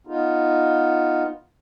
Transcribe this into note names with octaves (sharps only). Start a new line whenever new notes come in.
B3 D#4 F4